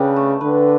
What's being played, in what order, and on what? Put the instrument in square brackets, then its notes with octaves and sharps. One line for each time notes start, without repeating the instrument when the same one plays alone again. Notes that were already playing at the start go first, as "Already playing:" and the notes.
Already playing: [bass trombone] C#3 [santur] D4 G4 B4
[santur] A3
[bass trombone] D3 [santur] B4